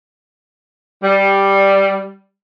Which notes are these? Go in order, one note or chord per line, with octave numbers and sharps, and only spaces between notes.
G3